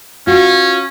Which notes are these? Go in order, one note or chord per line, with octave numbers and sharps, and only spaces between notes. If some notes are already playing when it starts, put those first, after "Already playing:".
C#4 F4 F#4